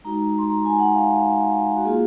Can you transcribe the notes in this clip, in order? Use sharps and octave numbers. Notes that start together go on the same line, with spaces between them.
G#3 D#4 F#4 A#5
C6
A#5
G#5
F#5
F5
F#4
A#3 F4 G#4